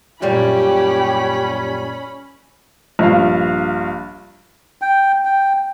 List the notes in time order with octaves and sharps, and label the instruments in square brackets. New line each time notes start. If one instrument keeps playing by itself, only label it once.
[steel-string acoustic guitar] F#2 A#2 G3 [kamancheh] C#4 B5 [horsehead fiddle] G4
[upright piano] A#1 G2 F5
[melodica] G5
G5